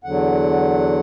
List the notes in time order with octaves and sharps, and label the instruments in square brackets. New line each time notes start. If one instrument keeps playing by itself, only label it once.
[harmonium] E2 D3 F#3 F#5